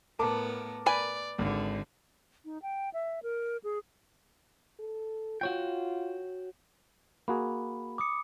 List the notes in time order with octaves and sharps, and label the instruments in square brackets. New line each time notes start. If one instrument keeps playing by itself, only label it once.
[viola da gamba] A2 B3 [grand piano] A#4 A5 D6
[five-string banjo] B4 G#5 [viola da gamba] D5
[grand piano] G#1 [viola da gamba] D3
[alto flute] D#4
G5
E5
A#4
G#4
[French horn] A4
[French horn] F4 [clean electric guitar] F#4 C#5 G5
[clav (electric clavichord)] A#3 F#4 G#4 [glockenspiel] B5
[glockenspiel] D6 D#6 C#7